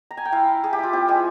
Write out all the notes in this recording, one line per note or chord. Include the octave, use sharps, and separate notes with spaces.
A#5
G#5
G5
E4 F5
E4
E4 G#4
G4
E4 F4
C4 G4
G#3 G#4